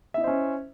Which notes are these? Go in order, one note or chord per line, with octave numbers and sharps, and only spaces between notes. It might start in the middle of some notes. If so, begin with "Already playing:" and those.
C#4 E4 C5 D#5 E5